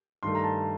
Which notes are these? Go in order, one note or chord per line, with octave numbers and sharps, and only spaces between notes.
G2 D#3 A3 C6
A#5
A5